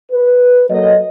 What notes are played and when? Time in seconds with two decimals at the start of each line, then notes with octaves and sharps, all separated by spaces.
0.12 B4
0.70 F#3 A#3 A4 D#5